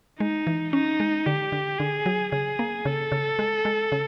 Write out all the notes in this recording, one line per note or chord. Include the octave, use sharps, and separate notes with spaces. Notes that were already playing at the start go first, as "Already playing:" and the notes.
G#3 D#4
E3
C#4 D#4
G#3
D3 G4
D3
D3 G#4
F#3
C#3 G#4
A#3
C#3 A4
C#3
G#3
G#3
C#3